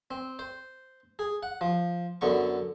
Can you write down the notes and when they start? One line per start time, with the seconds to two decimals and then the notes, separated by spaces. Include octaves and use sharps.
0.11 C4
0.39 C5
1.19 G#4
1.43 F#5
1.61 F3
2.21 F#2 D3 B3 C#6